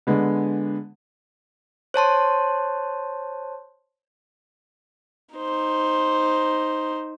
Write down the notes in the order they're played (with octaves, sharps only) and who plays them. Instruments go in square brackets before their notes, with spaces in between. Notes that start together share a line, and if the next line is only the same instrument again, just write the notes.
[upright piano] D3 G#3 B3
[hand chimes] C5 C#5 A5 C6
[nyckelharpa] D#4 C5